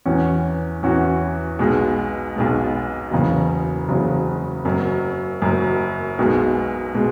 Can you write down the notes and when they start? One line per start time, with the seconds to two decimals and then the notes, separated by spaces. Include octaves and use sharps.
0.06 E2 E3 C#4 F#4
0.83 E2 E3 C#4 F#4
1.59 B1 B2 G#3
2.36 B1 B2 G#3
3.11 F#1 E2 C#3 F#3
3.88 F#1 E2 C#3 F#3
4.65 F#1 F#2 F#3
5.42 F#1 F#2 F#3
6.19 B1 B2 G#3
6.95 B2 G#3